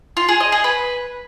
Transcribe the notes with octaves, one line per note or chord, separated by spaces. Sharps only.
F4
G#4
D#5
G#4
B4